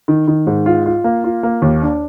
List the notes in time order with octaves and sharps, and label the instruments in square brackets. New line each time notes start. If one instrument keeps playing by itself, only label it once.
[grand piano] D#3
D#3
G#2
F4
F4
A#3
F4
A#3
D#2
D4